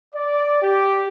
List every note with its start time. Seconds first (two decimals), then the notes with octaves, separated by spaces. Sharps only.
0.15 D5
0.63 G4